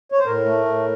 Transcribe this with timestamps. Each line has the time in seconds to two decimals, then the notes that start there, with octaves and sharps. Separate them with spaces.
0.12 C#5
0.19 C5
0.26 A2 A#4
0.45 A3
0.65 A2